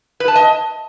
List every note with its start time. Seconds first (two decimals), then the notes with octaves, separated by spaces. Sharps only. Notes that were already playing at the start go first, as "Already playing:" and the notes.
0.20 B4
0.28 A5
0.36 D#5